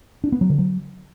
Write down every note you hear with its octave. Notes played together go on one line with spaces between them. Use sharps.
D4
B3
F#3
D3
F#3